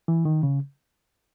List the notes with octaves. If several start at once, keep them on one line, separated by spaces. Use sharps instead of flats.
E3
D#3
C#3